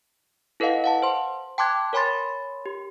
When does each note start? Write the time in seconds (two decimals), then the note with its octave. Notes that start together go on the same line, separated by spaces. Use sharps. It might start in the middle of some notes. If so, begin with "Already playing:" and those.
0.60 E4 A4 B4 D#5 F5 F#5
0.84 F5 F#5 A5
1.02 C5 C6
1.58 G5 A5 C6 D6 F#6 G#6
1.93 A#4 C#5 G#5 B5 C6 A6
2.66 G4